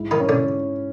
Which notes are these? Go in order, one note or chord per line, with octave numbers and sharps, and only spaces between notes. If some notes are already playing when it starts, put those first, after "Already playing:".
Already playing: G#2 E4
D#3 D#4
C#4
D3 D4